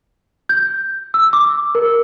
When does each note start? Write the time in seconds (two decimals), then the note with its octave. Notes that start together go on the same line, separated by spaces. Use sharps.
0.49 G6
1.14 E6
1.33 D6
1.75 A#4